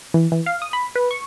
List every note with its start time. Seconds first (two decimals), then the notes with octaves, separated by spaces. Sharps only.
0.14 E3
0.32 E3
0.46 F5
0.62 D#6
0.73 B5
0.96 B4
1.11 C#6